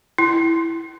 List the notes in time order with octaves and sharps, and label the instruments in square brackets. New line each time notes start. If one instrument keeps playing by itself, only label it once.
[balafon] E4